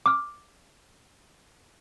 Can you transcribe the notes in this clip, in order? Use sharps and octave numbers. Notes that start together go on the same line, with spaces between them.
D6 F6